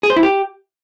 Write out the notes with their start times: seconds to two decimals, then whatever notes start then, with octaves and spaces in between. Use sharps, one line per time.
0.03 G#4
0.10 C5
0.16 E4
0.23 G4